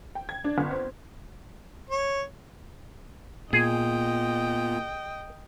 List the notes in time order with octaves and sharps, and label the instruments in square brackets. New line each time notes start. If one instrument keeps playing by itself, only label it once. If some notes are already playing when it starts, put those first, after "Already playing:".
[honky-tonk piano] G5
G#6
D4
G1
C4
[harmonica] C#5
[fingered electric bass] A#2 [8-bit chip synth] B3 F4 [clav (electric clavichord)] G#4 [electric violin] D#5 G5